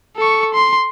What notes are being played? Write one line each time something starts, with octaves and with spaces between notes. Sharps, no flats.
A4 C#6
C6